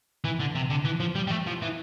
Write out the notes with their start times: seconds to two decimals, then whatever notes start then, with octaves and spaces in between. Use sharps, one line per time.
0.24 E3
0.40 D3
0.55 C3
0.70 D3
0.85 E3
1.00 F3
1.15 G3
1.27 G3
1.31 A3
1.47 F3
1.62 E3